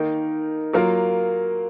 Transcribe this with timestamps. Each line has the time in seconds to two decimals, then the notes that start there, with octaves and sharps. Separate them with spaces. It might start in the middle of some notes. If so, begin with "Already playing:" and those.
Already playing: D#3 A#3 D#4 A#4
0.73 F#3 A#3 F4 A#4